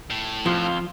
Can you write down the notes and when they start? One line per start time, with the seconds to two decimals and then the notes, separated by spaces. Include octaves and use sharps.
0.10 A2
0.46 F2 F3 F4